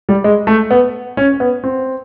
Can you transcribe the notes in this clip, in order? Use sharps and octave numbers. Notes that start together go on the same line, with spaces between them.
G3
G#3
A3
B3
C#4
B3
C4